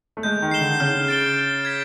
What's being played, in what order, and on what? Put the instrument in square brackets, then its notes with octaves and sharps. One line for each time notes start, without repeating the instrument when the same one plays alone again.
[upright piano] A3
[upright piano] G#3 [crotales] G6
[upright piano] D#3
[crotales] C7 E7 G7
[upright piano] D3
[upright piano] C#3 [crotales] F6
[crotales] A6 D7 G7
F6
G#6 B6